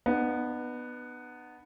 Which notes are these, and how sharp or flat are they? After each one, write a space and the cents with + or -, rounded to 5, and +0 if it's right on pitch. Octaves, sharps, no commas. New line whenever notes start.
B3 +0 D#4 -45